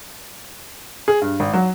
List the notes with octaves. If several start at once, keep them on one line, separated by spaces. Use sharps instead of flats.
G#4
G2
G#1
F#3